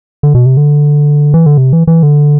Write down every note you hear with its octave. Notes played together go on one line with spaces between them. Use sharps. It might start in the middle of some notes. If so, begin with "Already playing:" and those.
D3
B2
C3
D3
E3
D3
C3
E3
E3
D3